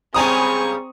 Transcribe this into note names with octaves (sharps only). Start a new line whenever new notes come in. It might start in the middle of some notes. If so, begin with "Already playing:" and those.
C#3 G3 G#3 C4 G#5 A#5 C#6 D#6